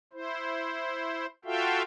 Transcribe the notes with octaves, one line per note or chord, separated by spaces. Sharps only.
E4 C5
F4 F#4 A4 E5 F5 G5